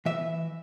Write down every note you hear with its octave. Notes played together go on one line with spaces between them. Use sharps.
E3 E5